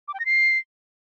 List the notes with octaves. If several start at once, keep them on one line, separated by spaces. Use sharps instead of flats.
D6
G5
A#6
C7